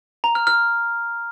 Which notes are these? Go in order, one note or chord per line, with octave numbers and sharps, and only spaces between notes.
A#5
F6
F6